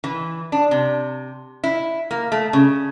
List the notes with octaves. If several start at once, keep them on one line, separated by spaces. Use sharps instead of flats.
E3
D4
C3
E4
A#3
A3
C#3